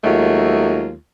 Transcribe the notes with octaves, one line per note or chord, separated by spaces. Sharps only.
D#2 F#3 G#3 A3 F4